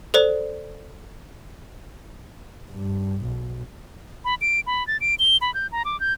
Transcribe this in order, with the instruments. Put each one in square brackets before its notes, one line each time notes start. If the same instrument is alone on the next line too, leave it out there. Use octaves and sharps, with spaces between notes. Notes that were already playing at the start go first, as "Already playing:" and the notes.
[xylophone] A4 C5 D5
[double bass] G2
B1
[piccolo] B5
D7
B5
A6
D7
G7
B5
G6
A#5
D6
G6